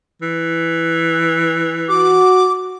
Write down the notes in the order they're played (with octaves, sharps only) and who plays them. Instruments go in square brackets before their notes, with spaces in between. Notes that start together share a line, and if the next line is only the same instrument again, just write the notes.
[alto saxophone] E3
[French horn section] F#4 [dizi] D6